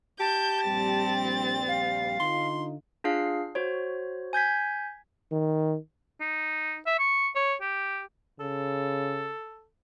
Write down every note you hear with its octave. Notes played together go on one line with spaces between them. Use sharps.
G4 A5 G6
A#1 G2 G3 C4 A6
F5
D3 D#4 F4 C6
D4 F4 G#4 F5 C7
F#4 C5 C#5
G#5 G6 G#6 B6
D#3
D#4
E5
C#6
C#5
G4
C#3 A4